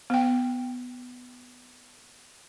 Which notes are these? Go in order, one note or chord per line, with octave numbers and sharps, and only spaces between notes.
B3 G5